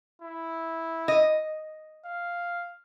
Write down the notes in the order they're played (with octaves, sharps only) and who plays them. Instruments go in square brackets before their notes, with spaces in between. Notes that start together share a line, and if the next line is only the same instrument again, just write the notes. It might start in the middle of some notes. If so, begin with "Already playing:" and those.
[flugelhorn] E4
[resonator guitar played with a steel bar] D#5
[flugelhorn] F5